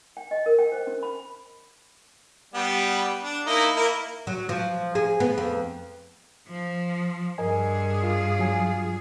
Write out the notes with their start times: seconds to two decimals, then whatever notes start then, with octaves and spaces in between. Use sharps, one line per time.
0.17 G5
0.31 D#5
0.46 A#4
0.59 G5
0.72 C5
0.87 C#4
1.03 B5
2.54 G3 B3
3.23 D4
3.46 A#3 D#4 E4
3.76 A#3 E4 A#4
4.27 F#3
4.49 F3
4.95 G#4
5.20 B3
5.38 F2
6.48 F3
7.38 G2 G#4 A#4 D#5 G#5
8.03 F4
8.39 F#3 G#5